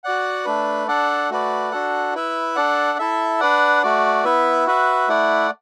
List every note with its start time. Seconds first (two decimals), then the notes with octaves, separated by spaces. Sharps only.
0.04 F#4 D5 F#5
0.45 A3 D4 B4
0.88 D4 A4 D5 F#5
1.30 A3 F#4 B4 D5
1.72 D4 F#4 A4 F#5
2.15 E4 B4 E5
2.55 D4 A4 D5 F#5
2.99 E4 A4 E5
3.40 D4 B4 D5 F#5
3.83 A3 F#4 D5
4.24 B3 E4 B4 E5
4.67 F#4 B4 E5
5.08 A3 E4 D5 F#5